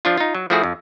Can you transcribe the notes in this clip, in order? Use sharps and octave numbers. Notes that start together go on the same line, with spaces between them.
F3 D4 F4
D#4 F4
F#3
F3 A3 E4 F#4 G#4
F2